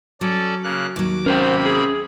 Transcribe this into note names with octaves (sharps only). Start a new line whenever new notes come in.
F#3 C#4 A4 D5
C#3 A#3 F#6
D#2 F#3 D6
C3 A#3 C#4 A#4 C5 G5 B5
G#4